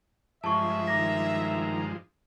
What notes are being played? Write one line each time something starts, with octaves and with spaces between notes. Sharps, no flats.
G2 F3 G#3 E5 A5 C#6
D#3 A#5 D6 A#6